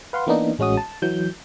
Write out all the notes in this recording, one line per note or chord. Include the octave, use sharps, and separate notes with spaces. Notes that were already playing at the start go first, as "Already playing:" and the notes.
B4 F5 F#5 C6
E3 A#3 B3 D4 D#4
A1 G#3 C#4 F#4 D#6
A5
E3 F#3 G6